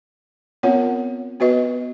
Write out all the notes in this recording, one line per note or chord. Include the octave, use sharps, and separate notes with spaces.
B3 C4 F4 A#4 C#5 F#5
B3 F#4 B4 D#5